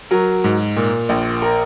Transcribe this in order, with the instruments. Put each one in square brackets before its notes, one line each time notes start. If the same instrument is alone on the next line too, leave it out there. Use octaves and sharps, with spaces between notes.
[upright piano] F#3 A#4
G#2
A#2
A#1
A#4